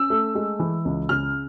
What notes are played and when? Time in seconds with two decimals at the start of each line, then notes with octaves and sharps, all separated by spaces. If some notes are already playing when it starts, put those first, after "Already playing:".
Already playing: C#4 E6
0.10 A3
0.35 G#3
0.60 E3
0.85 C#2
1.09 C#3 F6